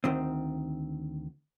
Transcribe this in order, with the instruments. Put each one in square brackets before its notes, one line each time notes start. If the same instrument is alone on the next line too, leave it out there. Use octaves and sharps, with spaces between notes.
[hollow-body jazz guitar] D2 D#3 C4